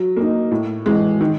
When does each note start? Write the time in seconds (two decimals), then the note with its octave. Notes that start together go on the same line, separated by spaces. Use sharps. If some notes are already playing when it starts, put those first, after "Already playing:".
Already playing: F#3
0.17 A#3 D#4
0.51 A2
0.86 E3 G#3
1.21 D#3